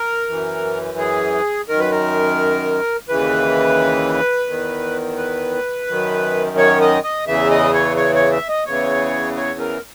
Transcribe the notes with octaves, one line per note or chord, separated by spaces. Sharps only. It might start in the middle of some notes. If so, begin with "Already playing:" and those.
Already playing: A#4
F#2 E3
G#4
F#2 D#3 A#4
B4
A#4
D#2 C#3 E3 B4
E2 D#3
B4
F#2 D#3
C#5
D#5
D#5
E2 C#3 E3 E5
D#5
C#5
C#5
C#5
E5
D#5
E2 C#3 E3 C#5
C#5
A#4